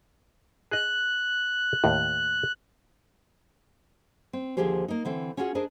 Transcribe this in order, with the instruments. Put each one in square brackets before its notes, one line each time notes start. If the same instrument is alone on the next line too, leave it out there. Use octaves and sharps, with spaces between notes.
[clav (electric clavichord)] G#4 D#5 [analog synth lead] F#6
[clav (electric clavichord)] D#2 A2
[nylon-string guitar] C4
D#2 D3 F3 G4 G#4 C5
A#3 D#4
D3 E3 C4
C#4 F4 F#4 G#4 F#5
D4 G#4 A#4 C5 D#5